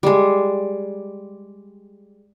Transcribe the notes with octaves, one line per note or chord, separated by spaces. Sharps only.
G3 G#3